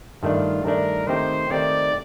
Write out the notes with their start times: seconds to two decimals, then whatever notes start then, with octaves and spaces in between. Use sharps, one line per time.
0.22 G2 D#3 A3 D4 F4
0.64 G2 D#3 A3 D4 A#4
1.07 D#3 A3 C4 D#4 G4 C5
1.50 D#3 A3 C4 D#4 G4 D5